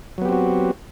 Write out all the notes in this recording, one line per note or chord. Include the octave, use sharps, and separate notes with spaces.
F#3 B3 C4 F#4 G4